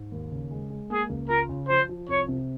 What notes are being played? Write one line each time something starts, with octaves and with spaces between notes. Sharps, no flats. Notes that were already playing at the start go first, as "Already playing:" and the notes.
Already playing: G#2
D#2
C#3
G#3
G#3
A#3 G#4
C#2
F4 A#4
C#3
F3 C5
F3
C2 C#5
C3